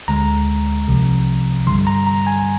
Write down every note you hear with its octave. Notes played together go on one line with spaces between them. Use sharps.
D2 D3 G#3 A#5
C2 C3 F3
G2 D3 G3 C6
A#5
A#5
G#5